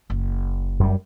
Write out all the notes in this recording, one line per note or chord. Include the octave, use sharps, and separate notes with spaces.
F#1
F#2 G3